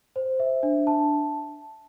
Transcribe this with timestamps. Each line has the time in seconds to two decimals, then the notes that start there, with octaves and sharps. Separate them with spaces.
0.16 C5
0.40 E5
0.63 D4
0.87 A5